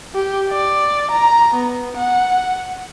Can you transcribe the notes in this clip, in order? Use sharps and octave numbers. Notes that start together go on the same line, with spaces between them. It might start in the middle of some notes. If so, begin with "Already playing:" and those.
G4
D5
A#5
B3
F#5